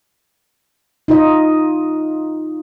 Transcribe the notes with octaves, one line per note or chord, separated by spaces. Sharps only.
D#4 F4 D#5